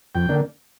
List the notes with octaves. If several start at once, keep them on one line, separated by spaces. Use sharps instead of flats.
F2 G5
D3 A#3 D4